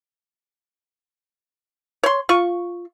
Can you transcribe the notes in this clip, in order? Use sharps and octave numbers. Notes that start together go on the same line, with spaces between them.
C#5 C6
F4 C#6